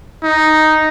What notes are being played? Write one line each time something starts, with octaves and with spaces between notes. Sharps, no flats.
D#4